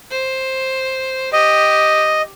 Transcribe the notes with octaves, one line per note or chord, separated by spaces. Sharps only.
C5
G4 D#5